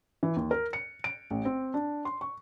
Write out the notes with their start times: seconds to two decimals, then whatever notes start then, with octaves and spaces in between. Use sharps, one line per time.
0.23 E3
0.36 D#2
0.51 A#4
0.73 C#7
1.04 D7
1.31 A1
1.45 C4
1.74 D4
2.05 C6
2.21 C#6